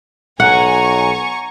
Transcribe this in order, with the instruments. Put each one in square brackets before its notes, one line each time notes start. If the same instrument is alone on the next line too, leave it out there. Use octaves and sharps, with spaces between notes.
[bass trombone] B1 [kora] F#5 [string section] G#5 A#5 C#6